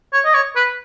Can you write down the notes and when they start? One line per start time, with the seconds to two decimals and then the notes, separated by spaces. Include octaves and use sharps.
0.13 C#5
0.25 D#5
0.35 C#5
0.56 B4